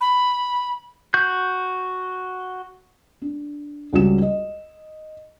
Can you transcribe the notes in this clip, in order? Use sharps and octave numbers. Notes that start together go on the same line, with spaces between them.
B5
F#4 G6
D4
C#2 G3 C#4 F#4 E7
D#5